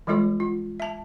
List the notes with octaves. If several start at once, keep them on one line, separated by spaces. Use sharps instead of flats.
E3 G3 G#3 F4 A4 C#5
F4
E5 A5